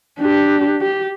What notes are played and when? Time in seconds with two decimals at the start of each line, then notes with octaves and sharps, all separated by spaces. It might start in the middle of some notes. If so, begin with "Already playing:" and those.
0.19 D4 G4
0.81 G4